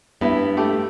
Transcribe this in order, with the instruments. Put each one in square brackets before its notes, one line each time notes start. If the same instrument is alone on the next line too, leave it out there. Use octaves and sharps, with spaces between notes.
[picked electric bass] G2 [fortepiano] B3 E4 E5
[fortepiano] A3 G4